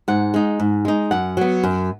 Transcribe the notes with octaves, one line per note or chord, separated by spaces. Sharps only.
G#2 F#5
G#3 D#4
G#2
G#3 D#4
F#2 F#5
F#3 B3
F#2